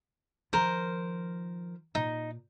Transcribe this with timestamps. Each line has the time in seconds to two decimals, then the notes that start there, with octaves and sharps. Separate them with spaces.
0.53 D#3 F3 A#4 C5
1.95 A#2 D#4